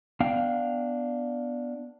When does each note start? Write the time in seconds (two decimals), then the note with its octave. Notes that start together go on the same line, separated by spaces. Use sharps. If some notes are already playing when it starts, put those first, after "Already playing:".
0.20 B3 D4 F5 G5